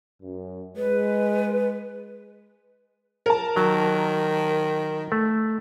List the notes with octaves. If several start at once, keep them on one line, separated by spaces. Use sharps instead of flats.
F#2
G#3 B4
A#4 A5
D#3 F#3
A3